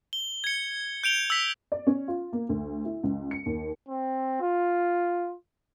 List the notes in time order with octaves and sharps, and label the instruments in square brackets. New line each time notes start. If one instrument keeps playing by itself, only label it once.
[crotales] G7
G#6 C#7
G6 D7 F7 G7
E6 B6
[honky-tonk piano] D5
C#4
F4
A#3
D2
E4
C#2
C#7
D#2
[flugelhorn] C4
F4